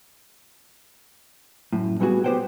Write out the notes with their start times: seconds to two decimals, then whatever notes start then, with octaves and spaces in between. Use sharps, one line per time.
1.73 F#2 A2
2.00 A#2 G3 B3 C#4 F#4 G#4
2.24 B3 G4 B4 C5 F#5 G5